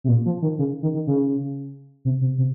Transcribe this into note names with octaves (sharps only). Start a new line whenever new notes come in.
C3
A#2
F3
D#3
C#3
D#3
D#3
C#3
C3
C3
C3